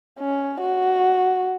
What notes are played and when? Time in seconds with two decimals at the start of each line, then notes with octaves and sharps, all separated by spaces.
0.19 C#4
0.61 F#4